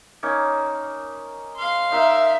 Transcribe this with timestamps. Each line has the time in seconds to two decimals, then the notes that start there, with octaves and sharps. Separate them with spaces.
0.23 A#3 C#4 D#4
1.56 F5 C6
1.92 D#4 A#4 E5 E6